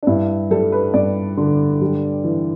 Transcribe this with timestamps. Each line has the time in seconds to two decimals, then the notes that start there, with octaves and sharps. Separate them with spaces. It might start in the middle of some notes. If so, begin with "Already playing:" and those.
0.03 D4
0.07 G2 E4
0.51 G3 A4
0.72 B4
0.94 G2 D5
1.37 D3
1.81 G3
2.24 E3